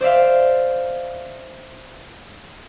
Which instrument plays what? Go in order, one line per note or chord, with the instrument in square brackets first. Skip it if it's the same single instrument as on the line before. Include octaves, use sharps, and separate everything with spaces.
[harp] C5 D5 E5 F5